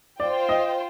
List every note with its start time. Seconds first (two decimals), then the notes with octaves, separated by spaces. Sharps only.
0.20 F4 C5 D5 G5
0.49 D#5